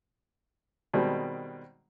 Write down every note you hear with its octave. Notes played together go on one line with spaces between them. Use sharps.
B2 D#3 G3 G#3 C4